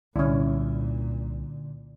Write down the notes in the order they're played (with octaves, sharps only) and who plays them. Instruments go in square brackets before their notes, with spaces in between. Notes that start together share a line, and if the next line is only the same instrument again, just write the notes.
[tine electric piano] C2 [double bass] A#2 [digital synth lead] D3 [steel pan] C#4 E4